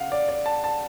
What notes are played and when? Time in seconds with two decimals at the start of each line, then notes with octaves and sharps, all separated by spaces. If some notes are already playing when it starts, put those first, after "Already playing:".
Already playing: C#3 F5 F#5
0.12 D5
0.29 D5
0.46 A5
0.64 A5